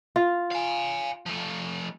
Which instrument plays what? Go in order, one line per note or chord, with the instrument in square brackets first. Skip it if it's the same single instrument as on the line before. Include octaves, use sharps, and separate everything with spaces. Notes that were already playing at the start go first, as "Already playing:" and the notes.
[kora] F4
[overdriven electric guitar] F5 G#5
F3 A3